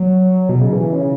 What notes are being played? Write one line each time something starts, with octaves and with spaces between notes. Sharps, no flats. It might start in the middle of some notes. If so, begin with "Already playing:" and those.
Already playing: F#3
B2
C#3
E3
C#3